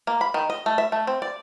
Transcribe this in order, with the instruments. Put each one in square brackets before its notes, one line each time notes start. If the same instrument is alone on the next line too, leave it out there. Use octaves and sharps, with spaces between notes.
[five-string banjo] A#3
B5
D#3
D#5
A3
E5
A3
C4
D5